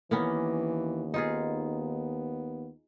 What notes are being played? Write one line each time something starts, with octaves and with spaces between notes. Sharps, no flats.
D#2 E3 A#3 B3 C#4
B3 D#4 F4 G#4